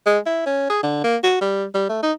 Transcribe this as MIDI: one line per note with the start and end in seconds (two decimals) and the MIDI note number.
0.06 0.18 56
0.26 0.44 64
0.46 0.69 61
0.70 0.79 68
0.83 1.03 50
1.04 1.17 58
1.24 1.39 66
1.41 1.66 55
1.74 1.88 55
1.89 2.01 57
2.03 2.12 63